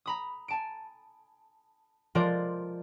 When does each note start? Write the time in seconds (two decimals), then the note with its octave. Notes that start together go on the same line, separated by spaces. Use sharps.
0.06 A#5 B5 D#6
0.48 G#5 A5 D7
2.15 F3 G#3 F4 A#4 C5 D5